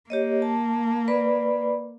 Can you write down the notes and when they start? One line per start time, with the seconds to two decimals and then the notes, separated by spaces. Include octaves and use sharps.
0.10 A#3 G4 C#5 D#5
0.42 A5
1.08 B4 D5 B5